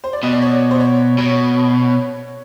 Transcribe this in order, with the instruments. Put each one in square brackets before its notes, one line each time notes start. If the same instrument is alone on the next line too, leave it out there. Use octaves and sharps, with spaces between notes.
[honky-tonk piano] C5
D5
[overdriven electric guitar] B2 [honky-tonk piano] D#5
[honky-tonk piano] D5
C#5
C5
C#5
[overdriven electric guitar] B2 [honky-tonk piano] C#5